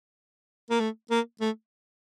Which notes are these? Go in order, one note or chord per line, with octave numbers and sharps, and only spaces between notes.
A#3
A3
A#3
A3